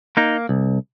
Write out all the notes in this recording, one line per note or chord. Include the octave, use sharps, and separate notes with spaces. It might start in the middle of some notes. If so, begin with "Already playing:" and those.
A#3 D#4
C2